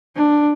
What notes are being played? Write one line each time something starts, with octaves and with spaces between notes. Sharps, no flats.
D4